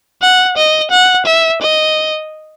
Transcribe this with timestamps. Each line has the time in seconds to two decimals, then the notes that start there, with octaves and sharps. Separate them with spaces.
0.22 F#5
0.57 D#5
0.91 F#5
1.26 E5
1.61 D#5